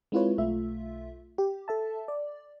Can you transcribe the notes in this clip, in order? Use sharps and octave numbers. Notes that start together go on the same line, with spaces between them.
G#3 C4 E4 F4 B4 C#5
B1 A3 F4 E5
G4
A4 E5 A5
D5